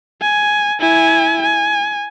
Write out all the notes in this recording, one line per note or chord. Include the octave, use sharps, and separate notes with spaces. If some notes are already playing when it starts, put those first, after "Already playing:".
G#5
E4 G#5
G#5